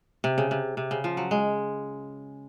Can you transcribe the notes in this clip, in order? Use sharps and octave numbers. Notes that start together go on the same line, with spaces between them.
C3
C#3
C3
C3
C#3
F3
F#3
G#3